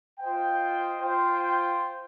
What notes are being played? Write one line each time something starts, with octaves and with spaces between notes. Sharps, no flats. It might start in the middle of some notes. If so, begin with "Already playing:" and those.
F4 C5 D#5 G5
F4 C5 G5